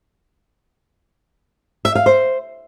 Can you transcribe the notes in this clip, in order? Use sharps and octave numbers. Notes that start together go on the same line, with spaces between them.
E5
F5
C5